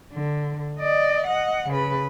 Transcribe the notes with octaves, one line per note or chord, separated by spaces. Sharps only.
D3
D5 D#5
D#5 F#5
C#3 B4